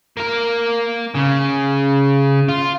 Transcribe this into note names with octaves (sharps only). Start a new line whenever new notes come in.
A#3 A#4
C#3
F4